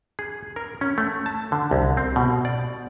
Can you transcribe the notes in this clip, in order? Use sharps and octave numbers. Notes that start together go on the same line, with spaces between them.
G#4
A#4
C#4
A3
A5
D3
C2
C4
B2
D5